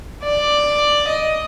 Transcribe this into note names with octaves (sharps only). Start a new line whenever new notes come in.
D5
D#5